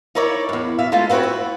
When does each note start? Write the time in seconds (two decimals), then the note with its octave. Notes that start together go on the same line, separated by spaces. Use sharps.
0.15 D#4 E4 A#4 C#5 D5
0.49 E2 G2
0.78 B2 E5 F5
0.92 G#3 A3 B3 F4
1.10 B3 C4 F#4 B4 C#5
1.23 E4